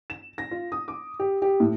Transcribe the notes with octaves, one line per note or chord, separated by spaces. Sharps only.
E7
A#6
F4
D#6
D6
G4
G4
A2